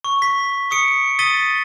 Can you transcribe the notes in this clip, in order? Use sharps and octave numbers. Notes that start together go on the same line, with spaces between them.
C#6
B6
C#6 D#6 C#7 D7
D#6 A6 B6 D#7 G7